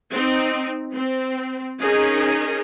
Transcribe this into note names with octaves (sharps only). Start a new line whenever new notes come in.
C4 D#4
C4
C#4 D#4 G#4 A#4